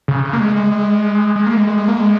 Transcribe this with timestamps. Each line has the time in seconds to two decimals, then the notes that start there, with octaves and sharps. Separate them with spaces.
0.08 C#3
0.24 C#3
0.33 A#3
0.40 G#3
0.56 G#3
0.71 G#3
1.36 G#3
1.46 A#3
1.57 G#3
1.67 G#3
1.77 G#3
1.88 A#3
1.99 G#3